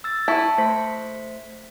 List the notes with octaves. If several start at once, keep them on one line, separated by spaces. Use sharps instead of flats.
E6 A6
E4 A5 C#6
A3 C5 B6